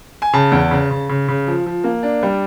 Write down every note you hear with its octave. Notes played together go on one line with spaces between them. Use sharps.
G#5
C#3 A5
E2
C#3
C#3
C#3
C#3
F3
F3
A#3
D4
G3